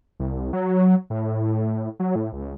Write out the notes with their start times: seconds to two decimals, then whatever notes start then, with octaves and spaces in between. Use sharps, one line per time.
0.20 C2
0.53 F#3
1.10 A2
2.00 F#3
2.16 A2
2.33 C#2